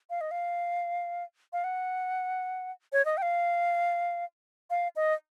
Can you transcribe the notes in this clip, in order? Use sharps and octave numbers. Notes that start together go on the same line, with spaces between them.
F5
D#5
F5
F5
F#5
C#5
D#5
G5
F5
F5
D#5